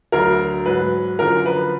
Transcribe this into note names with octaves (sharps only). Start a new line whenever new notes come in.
D2 D3 F#3 A#4
G#2 F#3 B4
F#2 D3 F3 A#4
B4